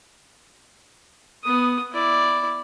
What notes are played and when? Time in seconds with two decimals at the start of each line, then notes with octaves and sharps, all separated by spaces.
1.44 B3 D#6
1.93 E4 D5